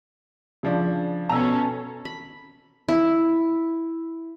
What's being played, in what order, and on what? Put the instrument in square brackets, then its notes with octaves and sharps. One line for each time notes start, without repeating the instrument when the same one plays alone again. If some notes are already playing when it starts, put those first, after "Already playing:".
[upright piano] C#3 F3 D4
[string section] B2 C#4 A4 [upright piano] A#5 E6
[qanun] B5
E4